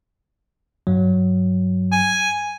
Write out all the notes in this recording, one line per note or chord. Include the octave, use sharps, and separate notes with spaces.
G2 F#3
G#5